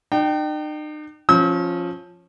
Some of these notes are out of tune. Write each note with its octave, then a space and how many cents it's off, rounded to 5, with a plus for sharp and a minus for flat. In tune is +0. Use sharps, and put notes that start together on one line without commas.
D#4 -45 G5 -15
F3 +0 C#4 -20 E6 -40